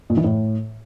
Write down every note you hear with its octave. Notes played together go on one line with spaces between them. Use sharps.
A#2
E3
A2